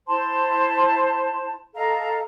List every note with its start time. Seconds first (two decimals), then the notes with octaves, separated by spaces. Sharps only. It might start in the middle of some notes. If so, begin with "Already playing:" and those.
0.07 E4 C5 A5 C6
1.75 A4 D#5 F5 A#5